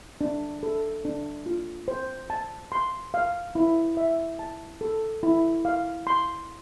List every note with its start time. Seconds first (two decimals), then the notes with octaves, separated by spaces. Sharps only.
0.21 D4
0.63 A4
1.05 D4
1.46 F4
1.88 C5
2.30 A5
2.72 C6
3.14 F5
3.55 E4
3.97 E5
4.39 A5
4.81 A4
5.23 E4
5.65 F5
6.07 C6